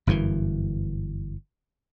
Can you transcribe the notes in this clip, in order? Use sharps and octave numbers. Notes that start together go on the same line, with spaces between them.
G1 F#2 C#3 E3